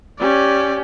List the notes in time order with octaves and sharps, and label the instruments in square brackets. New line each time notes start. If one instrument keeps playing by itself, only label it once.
[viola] C#4 G4 [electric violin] D5